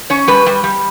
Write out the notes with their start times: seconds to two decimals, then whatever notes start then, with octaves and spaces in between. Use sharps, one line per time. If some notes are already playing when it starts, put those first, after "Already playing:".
0.10 C#4 C#5
0.28 G3 B4
0.46 G3
0.64 G3